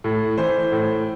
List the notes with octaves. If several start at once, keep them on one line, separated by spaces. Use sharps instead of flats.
A2
E3 C5
A2